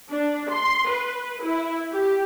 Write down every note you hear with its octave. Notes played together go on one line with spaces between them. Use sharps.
D4
C6
B4
E4
G4